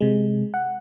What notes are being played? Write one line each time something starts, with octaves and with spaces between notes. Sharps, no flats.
C3 G#3
F#5